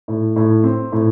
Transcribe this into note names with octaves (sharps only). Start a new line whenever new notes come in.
A2
A2
C4
A2